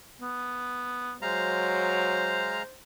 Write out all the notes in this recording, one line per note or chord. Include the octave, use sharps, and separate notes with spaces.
B3
F#3 G#3 C5 F5 A#5